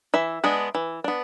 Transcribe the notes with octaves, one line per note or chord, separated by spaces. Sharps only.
E3 E5
G#3 B3 D4
E3
B3 D4